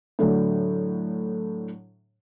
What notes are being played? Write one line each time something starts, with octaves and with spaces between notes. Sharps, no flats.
A2 D3 F#3